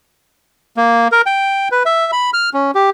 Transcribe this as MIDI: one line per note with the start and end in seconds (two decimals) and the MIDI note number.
0.77 1.08 58
1.12 1.22 70
1.26 1.69 79
1.72 1.83 71
1.86 2.11 76
2.12 2.30 83
2.34 2.50 89
2.54 2.71 61
2.75 2.90 67